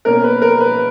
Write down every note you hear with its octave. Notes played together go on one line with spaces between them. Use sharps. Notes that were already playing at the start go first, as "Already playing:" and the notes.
B2 A#3 C#4 A#4
B4
A#4
B4